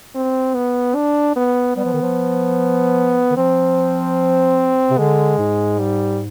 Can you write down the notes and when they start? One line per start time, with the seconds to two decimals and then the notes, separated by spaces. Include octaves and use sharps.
0.15 C4
0.55 B3
0.95 D4
1.36 B3
1.76 G3 B3
1.85 F3
1.93 D#3
2.02 F3
3.31 D#3
3.37 F3 C4
4.90 C3
4.98 D3 G#3
5.38 G#2
5.79 G3